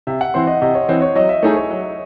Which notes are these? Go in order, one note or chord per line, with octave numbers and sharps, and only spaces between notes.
C3 E5
F#5
E3 C4 C6
D#5
C3 D#5
C#5
E3 C4 C#5
C#5
F#3 D#5
E5
A3 D#4 G#4 C#5
C#5
F#3